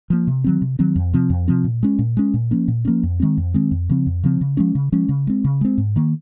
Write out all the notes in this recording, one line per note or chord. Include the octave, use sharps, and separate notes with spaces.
F3 A#3
C3
D#3 F#3 C4
C3
D#3 F#3 C4
F2
C3 F3 C4
F2
C3 F3 C4
A#2
G#3 C#4
A#2
G#3 C#4
A#2
F3 A#3 C#4
A#2
F3 A#3 C#4
F2
D#3 G#3 C4
F2
D#3 G#3 C4
F2
C#3 F3 C4
F2
C#3 F3 C4
C#3
F3 G#3 C#4
C#3
F3 G#3 C#4
C#3
G#3 C4
C#3
G#3 C4
G#2
D#3 A#3